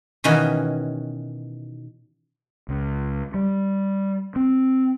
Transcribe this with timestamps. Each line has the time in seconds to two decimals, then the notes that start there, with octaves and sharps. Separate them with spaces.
0.24 B2 D#3 E3 C#4 F#4
2.69 C#2
3.34 G3
4.36 C4